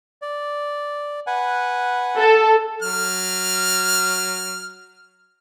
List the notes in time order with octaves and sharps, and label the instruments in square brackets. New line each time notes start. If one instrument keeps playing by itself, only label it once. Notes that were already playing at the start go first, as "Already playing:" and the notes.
[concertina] D5
B4 F#5 G#5
[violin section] A4
[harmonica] F#3 F6